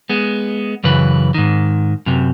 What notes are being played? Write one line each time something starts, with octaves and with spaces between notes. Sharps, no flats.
G#3 B3
F#2 C#3 E3 B4
G#2 D#3
F#2 C3